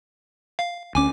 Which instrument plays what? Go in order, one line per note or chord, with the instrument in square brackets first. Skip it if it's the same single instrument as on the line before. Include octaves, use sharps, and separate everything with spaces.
[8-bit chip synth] F5
[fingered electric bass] D2 C#4 [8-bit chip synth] G#5 D6